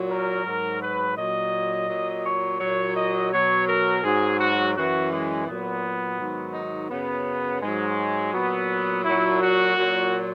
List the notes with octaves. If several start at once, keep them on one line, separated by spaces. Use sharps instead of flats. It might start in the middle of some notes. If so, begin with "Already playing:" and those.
Already playing: A#2 F#3
A#4
G#2 F#3
B4
A#2 F#3 D#5
A#2 F#3
C#5
A#2 F#3 C#5
D#5
B2 F#3 C#5
A#4
G#2 F#3 G#4
F#4
F#2 E3 F#4
G#3
A#2 F#3 B3
G#2 D#3 F#3
D#4
F#2 C#3 F#3 B3
G#2 F#3 G#3
A#2 F#3 B3
A#2 F#3 E4
F#4
A#2 F#3